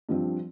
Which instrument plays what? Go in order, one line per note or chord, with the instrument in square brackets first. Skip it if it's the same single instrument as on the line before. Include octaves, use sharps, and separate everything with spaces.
[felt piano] G2 F3 C4